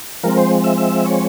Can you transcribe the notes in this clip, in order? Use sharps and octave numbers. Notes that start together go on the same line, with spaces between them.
F3 G#3 C4 A#4
C5
E5
E5
C#5